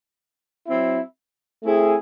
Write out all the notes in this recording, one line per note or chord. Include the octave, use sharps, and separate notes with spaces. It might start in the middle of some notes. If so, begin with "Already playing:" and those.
F#3 C4 E4
A3 C4 E4 G#4